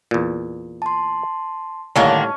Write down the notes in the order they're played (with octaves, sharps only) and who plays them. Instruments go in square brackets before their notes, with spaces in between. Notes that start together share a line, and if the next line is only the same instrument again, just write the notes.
[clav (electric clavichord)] E2 A#2
[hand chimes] A5 C6
[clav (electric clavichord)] A2 G3 [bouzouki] D3 D#3 A#3 [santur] C#4 D#5 [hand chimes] A5